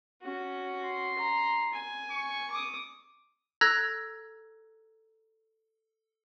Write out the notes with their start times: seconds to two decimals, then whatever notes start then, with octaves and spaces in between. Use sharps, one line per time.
0.22 C#4 F#4
0.85 C6
1.18 A#5
1.73 G#5
2.12 C#6
2.51 D6 D#6
3.61 A4 A#5 E6 F#6 G#6 A#6